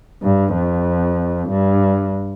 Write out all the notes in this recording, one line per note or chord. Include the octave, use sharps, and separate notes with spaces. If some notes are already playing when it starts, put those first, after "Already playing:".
G2
F2
G2